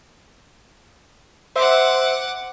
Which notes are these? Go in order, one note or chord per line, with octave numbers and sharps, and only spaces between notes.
C5 E5 F#5 D6